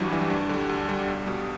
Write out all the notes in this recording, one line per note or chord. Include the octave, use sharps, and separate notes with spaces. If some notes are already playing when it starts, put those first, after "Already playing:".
Already playing: G1 G2 E3 F#3 G3 D4 E4 F#4
G2 E3 G3
D2 D4
D3 G3
D2
D3 G3
B1
B2 G3